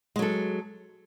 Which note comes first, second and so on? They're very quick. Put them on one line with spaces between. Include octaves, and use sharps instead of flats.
G#3 F#3 A4